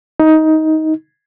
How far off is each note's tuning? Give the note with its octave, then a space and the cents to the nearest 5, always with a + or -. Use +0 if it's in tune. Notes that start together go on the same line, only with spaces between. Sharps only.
D#4 +15